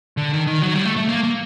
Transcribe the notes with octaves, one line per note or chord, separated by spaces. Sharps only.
D3
D#3
D#3
F#3
G3
A3
A3
A#3
A#3